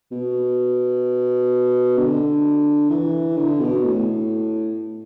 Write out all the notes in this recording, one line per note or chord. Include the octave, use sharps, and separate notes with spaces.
B2
D3
E3
D3
B2
A2